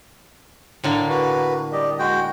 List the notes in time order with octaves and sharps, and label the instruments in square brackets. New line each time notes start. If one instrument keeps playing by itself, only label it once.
[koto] A2 D3 A#3
[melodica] F#4 B4
G3 G4 D#5
G#3 F#4 G5